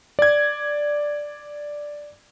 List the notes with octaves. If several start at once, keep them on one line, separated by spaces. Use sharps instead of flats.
D5 G#6